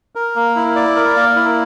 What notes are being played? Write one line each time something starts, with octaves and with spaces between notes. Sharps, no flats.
A#4
A#3
E4
D5
A#4
A#3
E4